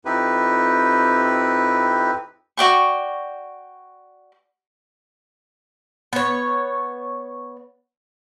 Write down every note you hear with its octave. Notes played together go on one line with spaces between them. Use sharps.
F2 C4 D#4 E4 G4 B4
F#4 D5 G5 C#6
B3 C#5